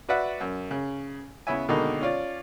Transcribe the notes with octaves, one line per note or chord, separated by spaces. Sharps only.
F#4 B4 D5 E5 F#5
F#2
C#3
C#3 B3 E4 C#5 E5 G#5
B2 D3 D#3 G#3 A#3 D#4
C#4 F4 D5